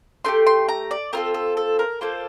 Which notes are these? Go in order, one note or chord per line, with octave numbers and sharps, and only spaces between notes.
A3 D4 G4 C6
C6
A#5
D5
C4 F4 A4 A#4
A4
A4
A#4
A#3 F4 A4 C5